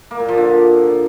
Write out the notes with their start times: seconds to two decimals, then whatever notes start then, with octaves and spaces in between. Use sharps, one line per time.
0.11 A#3
0.20 A#2
0.29 F3
0.37 D3